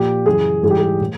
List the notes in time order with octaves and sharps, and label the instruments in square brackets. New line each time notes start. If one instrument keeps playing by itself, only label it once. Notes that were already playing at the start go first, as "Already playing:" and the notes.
Already playing: [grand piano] A#2 F3 G4
F#2 C#3 E3 G#4
G#2 E3 G3 G#4
G4
G#4
A2